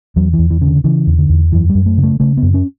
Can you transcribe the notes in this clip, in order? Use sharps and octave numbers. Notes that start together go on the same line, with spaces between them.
E2 F#3
E3
E2
E3
C#3
D3
C#3 E3
E2
D3
E2
F#2 E3
G3
F#2
A3
C#3
A3
C#3 A3
B3
F#2
C#4